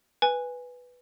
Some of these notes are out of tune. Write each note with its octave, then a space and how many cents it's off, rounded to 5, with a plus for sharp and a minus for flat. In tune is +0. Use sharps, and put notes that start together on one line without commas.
B4 +0 G#5 -10